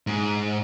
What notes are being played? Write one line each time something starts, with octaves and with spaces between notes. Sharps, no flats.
G#2